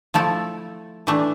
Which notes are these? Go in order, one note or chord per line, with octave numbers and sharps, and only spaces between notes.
F3 A3 E4 A4
E3 A3 D4